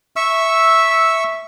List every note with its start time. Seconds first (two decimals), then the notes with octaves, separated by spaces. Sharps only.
0.16 E5 C#6 E6